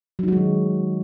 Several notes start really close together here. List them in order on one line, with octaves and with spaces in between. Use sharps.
F#3 D#4 F#4 G#3 D#3